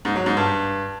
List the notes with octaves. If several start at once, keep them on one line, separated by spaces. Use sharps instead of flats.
G#2
F#3
G#2
G2